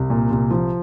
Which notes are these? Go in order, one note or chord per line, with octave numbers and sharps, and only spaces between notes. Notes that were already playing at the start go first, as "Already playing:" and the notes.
Already playing: C2
A#2
C2
F3